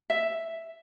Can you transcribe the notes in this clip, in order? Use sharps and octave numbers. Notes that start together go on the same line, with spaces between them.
E5